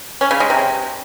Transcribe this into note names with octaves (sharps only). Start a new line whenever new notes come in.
C#4
C#3
G#3
C3